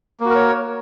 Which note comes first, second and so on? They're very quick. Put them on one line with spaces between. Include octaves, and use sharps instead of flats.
A#3 F#4 A#4 C#5